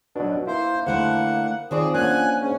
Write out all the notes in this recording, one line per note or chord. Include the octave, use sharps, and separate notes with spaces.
B2 F#3 D4
A#3 E4 C5
D3 A3 E4 C5 F#5
D#3 F3 C4 G#4 D5
A#3 C#4 D4 F#5 G#5 F#6
G#2 C#4